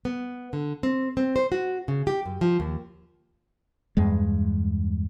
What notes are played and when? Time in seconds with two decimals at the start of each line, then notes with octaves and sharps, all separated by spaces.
0.05 B3
0.53 D3
0.83 C4
1.17 C4
1.36 C5
1.52 F#4
1.88 C#3
2.07 G4
2.26 F#2
2.41 F3
2.60 D#2
3.97 E2 G2 G#3